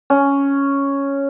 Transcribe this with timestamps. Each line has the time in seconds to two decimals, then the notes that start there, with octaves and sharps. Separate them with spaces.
0.10 C#4